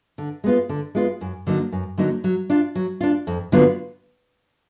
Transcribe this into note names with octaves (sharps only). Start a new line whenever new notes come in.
D3
G#3 B3 F4
D3
G#3 B3 F4
F#2
D3 F#3 A#3 D#4
F#2
D3 F#3 A#3 D#4
F#3
D4 F4
F#3
D4 F4
F2
D3 F#3 B3 F4